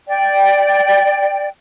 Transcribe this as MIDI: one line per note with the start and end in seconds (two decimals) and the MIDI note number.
0.08 1.47 74
0.08 1.47 79